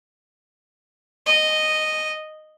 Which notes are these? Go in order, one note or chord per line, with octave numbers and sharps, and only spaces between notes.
D#5